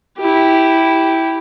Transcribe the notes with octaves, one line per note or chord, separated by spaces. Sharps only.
E4 G4